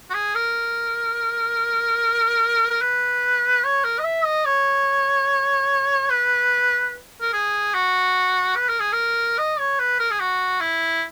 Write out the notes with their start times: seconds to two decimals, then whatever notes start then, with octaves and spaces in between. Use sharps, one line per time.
0.10 F#4
0.14 G#4
0.35 A#4
2.70 A#4
2.82 B4
3.64 C#5
3.84 A#4
3.99 D#5
4.04 E5
4.25 D#5
4.45 C#5
6.10 B4
7.22 A#4
7.33 G#4
7.74 F#4
8.56 B4
8.69 A#4
8.80 G#4
8.93 A#4
9.38 D#5
9.59 C#5
9.79 B4
9.99 A#4
10.11 G#4
10.20 F#4
10.61 E4